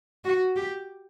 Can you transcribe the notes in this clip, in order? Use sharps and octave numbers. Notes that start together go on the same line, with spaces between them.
F#4
G4